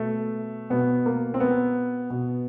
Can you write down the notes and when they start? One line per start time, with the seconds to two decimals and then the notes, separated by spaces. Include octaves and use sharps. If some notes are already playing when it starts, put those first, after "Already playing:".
Already playing: B2 A3
0.70 B2 B3
1.06 A#3
1.34 C4
1.40 B3
2.10 B2